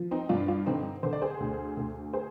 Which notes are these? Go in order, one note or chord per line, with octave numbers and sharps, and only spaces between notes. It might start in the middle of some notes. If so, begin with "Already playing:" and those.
Already playing: F3
C4 D#4
G2 D4 F4
D4 F4
D3 C4 D#4
D3 C5
D5
G#4 C5
D2
D2
G#4 C5